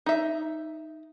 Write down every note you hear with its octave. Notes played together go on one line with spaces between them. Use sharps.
D#4 E5